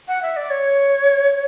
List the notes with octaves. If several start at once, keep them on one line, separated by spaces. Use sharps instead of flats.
F#5
E5
D5
C#5